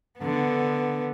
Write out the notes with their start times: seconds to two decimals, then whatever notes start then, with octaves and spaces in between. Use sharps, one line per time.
0.19 D3 B3